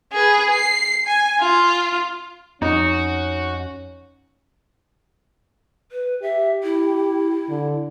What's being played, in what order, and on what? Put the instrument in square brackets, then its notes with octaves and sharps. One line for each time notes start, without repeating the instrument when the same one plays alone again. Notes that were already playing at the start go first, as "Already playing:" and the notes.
[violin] G#4 B4
C7
G#5
F4
[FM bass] F2 [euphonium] C#4 [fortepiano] D#4 [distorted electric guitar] F#4
[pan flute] B4
[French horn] G4 [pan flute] E5
[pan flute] E4
[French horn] D3